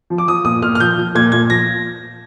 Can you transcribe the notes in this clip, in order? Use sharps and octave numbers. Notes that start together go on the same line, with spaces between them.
F3
D6
F3 D#6
A#2 D#6
A#2 F6
F6
F3 G6
F3
A#2 G#6
A#2 G#6
F3 A#6